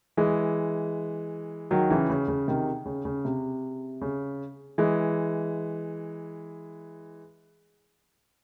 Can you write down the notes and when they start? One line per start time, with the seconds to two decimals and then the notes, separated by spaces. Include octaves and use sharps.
0.17 E3 G#3
1.71 D#3 F#3
1.90 C#3 E3
2.09 C#3
2.28 C#3
2.48 C3 D#3
2.86 C#3
3.05 C#3
3.25 C3
4.01 C#3
4.78 E3 G#3